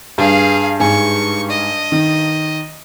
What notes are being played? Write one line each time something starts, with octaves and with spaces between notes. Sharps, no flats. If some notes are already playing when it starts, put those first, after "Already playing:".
G2 G#4 F5
G#2 G#5 C#6
D#5
D#3